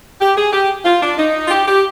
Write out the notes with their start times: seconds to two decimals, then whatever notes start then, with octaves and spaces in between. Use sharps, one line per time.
0.20 G4
0.36 G#4
0.52 G4
0.85 F4
1.02 D4
1.18 D#4
1.46 F4
1.50 G4
1.67 G4